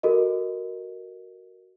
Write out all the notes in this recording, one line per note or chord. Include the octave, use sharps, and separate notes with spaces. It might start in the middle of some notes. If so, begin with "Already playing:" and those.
F#4 A4 A#4 D#5